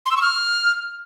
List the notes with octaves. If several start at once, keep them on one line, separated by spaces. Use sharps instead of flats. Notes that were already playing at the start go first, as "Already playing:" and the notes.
C6
E6
C#6
F6